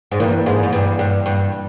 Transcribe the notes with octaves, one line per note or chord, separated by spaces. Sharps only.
G#2
G2 E3 A#3 E4 A#4
G#2
G#2
G2
G2
G2